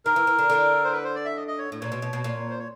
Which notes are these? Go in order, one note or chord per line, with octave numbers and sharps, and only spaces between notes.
D#3 A#4
E3
E3
D3
D3
C5
B4
C5
D5
E5
D#5
D#5
C#5
A2
A#2 C#5
B2
B2
B2
A#2
C5
C#5